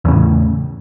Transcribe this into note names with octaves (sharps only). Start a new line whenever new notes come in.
E2 A2 C#3